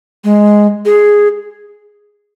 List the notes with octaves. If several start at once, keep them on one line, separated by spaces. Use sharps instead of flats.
G#3
G#4